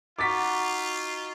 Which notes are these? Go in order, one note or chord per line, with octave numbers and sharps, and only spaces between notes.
D#4 F4 F#4 D6 A6 B6